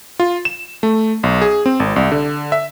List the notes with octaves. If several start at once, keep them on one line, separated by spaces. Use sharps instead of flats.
F4
E7
A3
B1
G#4
C4
G#1
C2
D3
E5